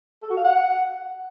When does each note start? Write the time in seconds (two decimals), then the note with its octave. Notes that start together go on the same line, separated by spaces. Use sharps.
0.23 A4
0.30 F#4
0.37 F5
0.44 F#5